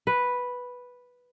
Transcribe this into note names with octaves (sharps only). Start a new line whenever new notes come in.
B4